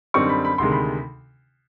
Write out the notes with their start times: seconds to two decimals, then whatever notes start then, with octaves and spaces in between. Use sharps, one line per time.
0.14 F#2 D3 G3 C4 D#4 C#6
0.29 B5
0.45 B5
0.58 D2 C3 D#3 G#3 C6
0.72 B5